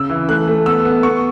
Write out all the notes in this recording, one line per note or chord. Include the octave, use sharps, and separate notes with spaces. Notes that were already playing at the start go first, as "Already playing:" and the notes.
Already playing: C#3 E6
E3
A3 F#6
A3
B3 E6
B3
B3 C#6